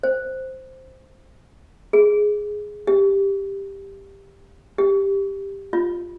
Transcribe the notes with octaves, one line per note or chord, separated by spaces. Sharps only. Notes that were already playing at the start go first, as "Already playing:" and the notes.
C5
G#4
G4
G4
F4